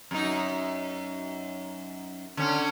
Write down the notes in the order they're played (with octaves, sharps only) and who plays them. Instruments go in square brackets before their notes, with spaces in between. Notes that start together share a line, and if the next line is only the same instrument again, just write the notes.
[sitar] F#2 D#4
D3 C#4